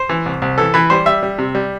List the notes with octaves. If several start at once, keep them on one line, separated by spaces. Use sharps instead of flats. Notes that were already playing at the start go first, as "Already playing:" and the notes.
Already playing: C5
E3
C2
C2
E3 A4
E3 B4
G3 C5
G3 E5
G3
C3
G3